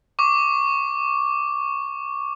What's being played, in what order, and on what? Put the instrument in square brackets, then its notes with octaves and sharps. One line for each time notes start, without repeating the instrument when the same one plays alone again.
[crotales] C#6 D6